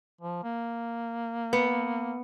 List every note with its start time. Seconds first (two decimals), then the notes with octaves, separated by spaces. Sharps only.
0.21 F3
0.43 A#3
1.53 B3